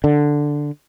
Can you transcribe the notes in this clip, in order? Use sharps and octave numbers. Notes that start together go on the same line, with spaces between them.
D3